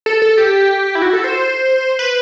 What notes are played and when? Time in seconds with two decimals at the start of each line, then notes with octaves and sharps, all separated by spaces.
0.06 A4
0.22 A4
0.38 G4
0.95 E4
1.02 F#4
1.13 A4
1.24 C5
1.99 B4